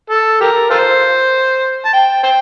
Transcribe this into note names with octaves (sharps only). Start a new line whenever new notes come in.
A4
G4 A#4
F4 A4 C5
A5
G5
C5 G5